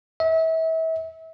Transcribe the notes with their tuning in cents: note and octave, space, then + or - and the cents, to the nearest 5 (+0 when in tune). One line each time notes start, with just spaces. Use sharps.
E5 -35